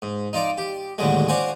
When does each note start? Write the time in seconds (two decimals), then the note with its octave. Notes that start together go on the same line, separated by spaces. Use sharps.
0.02 G#2
0.33 D#4 F4 D5 D6
0.58 G4
0.98 D#2 A2 D3 F#3 G#3
1.28 D4 F#4 C5 F5 F#5 G#5